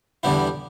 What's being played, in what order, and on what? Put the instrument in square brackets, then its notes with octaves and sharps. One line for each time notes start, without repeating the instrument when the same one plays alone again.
[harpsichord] E2 D3 G3 B3 E4